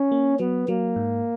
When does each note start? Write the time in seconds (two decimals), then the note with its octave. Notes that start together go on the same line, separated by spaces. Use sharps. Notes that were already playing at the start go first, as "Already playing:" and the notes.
Already playing: C#4
0.12 A#3
0.40 F#3 B3
0.68 F#3 A#3
0.96 G#2